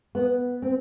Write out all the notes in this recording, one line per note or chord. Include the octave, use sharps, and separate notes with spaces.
B3
C4